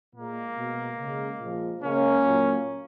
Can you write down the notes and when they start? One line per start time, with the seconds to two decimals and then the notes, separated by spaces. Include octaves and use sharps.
0.15 A#2 G#3 A#3
0.56 B2 G#3
0.98 C#3 G#3
1.40 A#2 F3 G#3
1.82 C#3 G#3 A#3 C#4
2.23 A#2 F#3